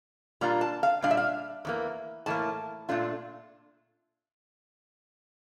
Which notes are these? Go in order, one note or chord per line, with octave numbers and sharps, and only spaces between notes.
A#2 G3 A#3 D4 F4 A#5
A5
F5
A#2 G3 D4 F5
E5
F5
E2 E3 A#3
A2 E3 A#3 A5
A#2 A3 D4 F4